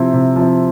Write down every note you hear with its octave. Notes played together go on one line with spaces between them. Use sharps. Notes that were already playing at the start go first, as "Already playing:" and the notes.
Already playing: C3 F3 C4 E4
C3
F3 C4 E4